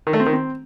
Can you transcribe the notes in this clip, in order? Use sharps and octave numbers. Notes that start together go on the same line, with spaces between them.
D#3
A3
C4
D#3
C4